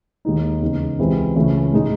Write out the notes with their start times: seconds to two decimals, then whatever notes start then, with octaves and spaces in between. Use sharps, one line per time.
0.25 D#2 D#3 G#3 D#4
0.62 E2 C#3 G#3 D#4
0.98 C#2 C3 E3 G#3 C4
1.35 C#2 C#3 E3 A3 C#4
1.73 A2 G#3 D#4